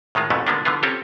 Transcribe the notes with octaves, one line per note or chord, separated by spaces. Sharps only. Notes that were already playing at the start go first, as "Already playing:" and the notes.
A2 D#3 G#3 F4
F2 G#2 B2 E3 A3 C#4
D3 F3 G#3 A#3 B3 D4
D3 E3 F3 B3 F4
C4 C#4 F4 G4 A4